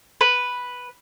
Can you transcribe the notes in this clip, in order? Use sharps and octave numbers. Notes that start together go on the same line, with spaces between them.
B4